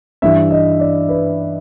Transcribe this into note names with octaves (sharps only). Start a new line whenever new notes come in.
G2 E3 G3 E5
D#5
D5
B4